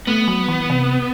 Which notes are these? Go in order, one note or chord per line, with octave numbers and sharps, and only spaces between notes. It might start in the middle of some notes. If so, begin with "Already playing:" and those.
A3 B3
F#3
E3
C3